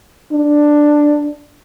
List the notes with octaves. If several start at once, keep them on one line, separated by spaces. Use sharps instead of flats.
D4